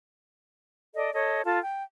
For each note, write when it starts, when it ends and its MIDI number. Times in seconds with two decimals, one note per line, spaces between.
0.95 1.14 69
0.95 1.14 74
0.95 1.14 75
1.14 1.42 69
1.14 1.42 73
1.14 1.42 75
1.44 1.59 65
1.44 1.59 69
1.44 1.59 81
1.62 1.83 79